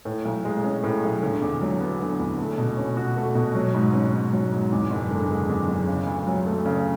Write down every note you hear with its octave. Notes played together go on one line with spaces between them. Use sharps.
A2
B1
G#3
C#4
A2
B1
D3
E2
F#3
B3
D3
E2
A3
B2
C#4
F#4
A3
B2
F#3
G#2
C#4
G#2
F#3
G#2
E2
F#1
D3
G#3
E2
F#1
C#3
D2
F#3
A3
C#3